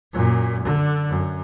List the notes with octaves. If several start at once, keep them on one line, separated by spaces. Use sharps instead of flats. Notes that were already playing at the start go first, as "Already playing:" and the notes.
F#2 A#2
D3
F#2